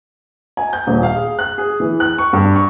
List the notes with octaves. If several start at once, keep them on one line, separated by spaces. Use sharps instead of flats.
G#5
G6
D#1
F5
G#4
F#6
G#4
E3
F#6
C#6
G2
C#6